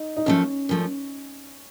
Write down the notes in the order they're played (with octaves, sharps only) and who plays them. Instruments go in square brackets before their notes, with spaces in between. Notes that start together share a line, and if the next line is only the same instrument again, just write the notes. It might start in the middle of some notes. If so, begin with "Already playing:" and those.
Already playing: [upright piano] D#4
D#4
[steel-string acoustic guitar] F#2 F3 A3 [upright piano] C#4
[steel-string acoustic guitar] F#2 F3 A3